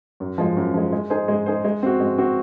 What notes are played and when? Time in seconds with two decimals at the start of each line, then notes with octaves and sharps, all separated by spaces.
0.20 F#2
0.38 F3 G#3
0.57 F#2
0.74 F3 G#3
0.92 G#3
1.10 D#4 G#4 C5
1.28 G#3
1.46 D#4 G#4 C5
1.64 G#3
1.83 C4 F#4
2.00 G#3
2.18 C4 F#4